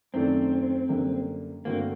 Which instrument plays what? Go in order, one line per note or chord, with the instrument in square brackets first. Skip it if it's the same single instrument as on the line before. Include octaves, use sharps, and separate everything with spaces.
[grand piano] F#2 D#3 A3 D4 [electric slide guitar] C4
[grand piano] F#2 D3 G3 A#3
[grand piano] G2 D3 A3 C4 F#4 [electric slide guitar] A#3